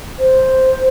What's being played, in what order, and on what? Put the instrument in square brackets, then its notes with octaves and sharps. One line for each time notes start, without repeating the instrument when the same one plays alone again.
[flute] C5